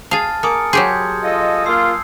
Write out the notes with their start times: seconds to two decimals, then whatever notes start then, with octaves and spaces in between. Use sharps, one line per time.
0.11 G#4 F5 A5 F6 A6
0.43 A#3 G#5 D#6 C#7
0.73 F#3 G4 G#4 C6 G6 G#6
1.23 F4 A4 D#5
1.66 A#3 F4 D#6 E6 C7